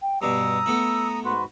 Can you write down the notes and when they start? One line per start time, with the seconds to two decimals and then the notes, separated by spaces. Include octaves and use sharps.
0.02 G5
0.22 G2 B2 A#5 D#6 E6
0.66 A3 B3 E4
1.25 G#2 F#4 B4 C6